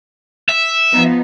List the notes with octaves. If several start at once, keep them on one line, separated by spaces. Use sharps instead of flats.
E5
F3 B3 D#4